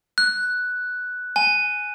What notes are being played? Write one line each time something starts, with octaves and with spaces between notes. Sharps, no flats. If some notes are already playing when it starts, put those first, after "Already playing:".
F#6
G#5